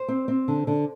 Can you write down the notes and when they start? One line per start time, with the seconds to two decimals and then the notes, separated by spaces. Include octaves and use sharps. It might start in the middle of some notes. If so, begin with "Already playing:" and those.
Already playing: C5
0.08 C4
0.28 C4
0.48 D3
0.67 D3